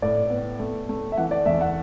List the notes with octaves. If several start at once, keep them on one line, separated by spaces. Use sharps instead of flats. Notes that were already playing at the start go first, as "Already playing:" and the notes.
A2 D5
B3
A3
A3
E5
E3 F#5
D5
E2 E5
F#5